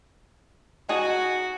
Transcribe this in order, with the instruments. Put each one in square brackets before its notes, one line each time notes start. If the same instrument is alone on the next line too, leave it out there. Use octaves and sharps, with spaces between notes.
[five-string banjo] D#4 G#4 A5 [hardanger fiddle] F#4